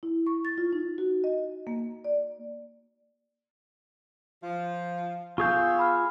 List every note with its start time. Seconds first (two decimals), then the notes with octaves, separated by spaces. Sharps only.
0.03 E4
0.27 C#6
0.45 A6
0.58 F4
0.73 D#4
0.98 F#4
1.24 D#5
1.67 A#3
2.04 D5
4.41 F3 F4
5.38 B3 F4 G#4 E5 F5 C#6 G6
5.79 B5 F6